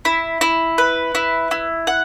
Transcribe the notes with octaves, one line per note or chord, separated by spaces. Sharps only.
E4
E4
B4
E4
E4
F#5